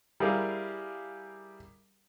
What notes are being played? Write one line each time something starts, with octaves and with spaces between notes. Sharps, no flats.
G3 E4 G4 G#4 A#4 F5